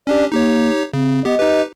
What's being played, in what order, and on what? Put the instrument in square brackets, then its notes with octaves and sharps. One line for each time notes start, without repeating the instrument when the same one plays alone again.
[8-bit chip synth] C#4 D4 G4 [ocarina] D5
[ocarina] A#3 [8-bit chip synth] D#4 G4 C#5
[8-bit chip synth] C#3 [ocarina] C4
[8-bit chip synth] B3 G4 [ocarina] D#5
[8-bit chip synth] D#4 G4 B4